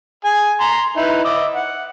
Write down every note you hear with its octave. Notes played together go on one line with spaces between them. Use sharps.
G#4 G#5
A#5 C6
D#4 E4 B4
D#5 E5 D6
F#5